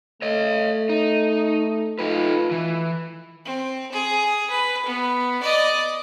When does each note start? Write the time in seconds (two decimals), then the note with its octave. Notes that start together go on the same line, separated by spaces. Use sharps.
0.22 A3 C#5 D#5
0.89 D#4
1.99 A3 D#4 F4 B4
2.51 E3
3.45 C4
3.92 G#4
4.50 B4
4.86 B3
5.42 D5 D#5